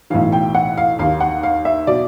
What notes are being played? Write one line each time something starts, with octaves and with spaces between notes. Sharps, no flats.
B1 A2 E3 F5
G5
F#5
F5
D#2 D#3 F5
F#5
F5
E5
B2 D5